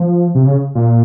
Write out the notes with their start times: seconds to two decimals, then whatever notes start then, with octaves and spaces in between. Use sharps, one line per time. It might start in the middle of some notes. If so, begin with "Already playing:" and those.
Already playing: F3
0.35 C3
0.46 C#3
0.75 A#2